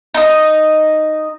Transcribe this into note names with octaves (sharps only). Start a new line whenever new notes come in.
D#4 D#5